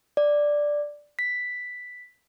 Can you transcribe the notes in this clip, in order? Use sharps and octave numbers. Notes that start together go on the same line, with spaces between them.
D5
B6